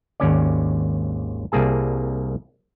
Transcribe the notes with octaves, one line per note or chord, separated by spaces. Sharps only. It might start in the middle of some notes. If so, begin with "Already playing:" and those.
G#1 D#2 C#4 D5
C2 G3 A#3 G#4 A5